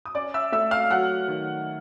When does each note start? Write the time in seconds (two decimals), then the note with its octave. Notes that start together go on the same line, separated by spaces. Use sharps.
0.05 D#6
0.15 C#4 D5 D6
0.34 E5 E6
0.52 A3 E5 E6
0.71 F5 F6
0.90 F#3 F#5 F#6
1.28 D#3